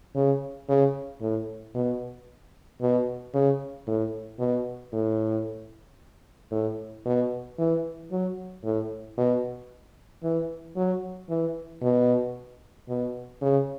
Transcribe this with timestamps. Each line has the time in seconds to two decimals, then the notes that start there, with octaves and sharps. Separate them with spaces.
0.15 C#3
0.69 C#3
1.21 A2
1.75 B2
2.81 B2
3.34 C#3
3.87 A2
4.39 B2
4.93 A2
6.51 A2
7.05 B2
7.58 E3
8.11 F#3
8.64 A2
9.18 B2
10.23 E3
10.76 F#3
11.29 E3
11.82 B2
12.89 B2
13.42 C#3